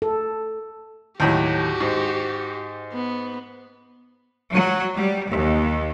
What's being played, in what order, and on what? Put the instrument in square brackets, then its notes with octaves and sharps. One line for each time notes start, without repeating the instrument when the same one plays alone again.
[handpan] A4
[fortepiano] D#2 A2 F#3 [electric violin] F#4 G4
[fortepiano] G#2
[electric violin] B3
[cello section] F#3
G3
D#2